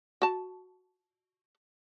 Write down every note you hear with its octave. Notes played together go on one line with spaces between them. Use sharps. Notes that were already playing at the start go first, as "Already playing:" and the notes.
F#4 A5